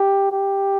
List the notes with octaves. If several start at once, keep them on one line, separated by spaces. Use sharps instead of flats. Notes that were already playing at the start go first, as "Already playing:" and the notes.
Already playing: G4
G4